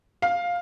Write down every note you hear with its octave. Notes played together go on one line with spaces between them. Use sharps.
F5